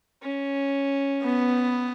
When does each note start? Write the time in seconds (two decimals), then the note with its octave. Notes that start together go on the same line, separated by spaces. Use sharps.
0.22 C#4
1.23 B3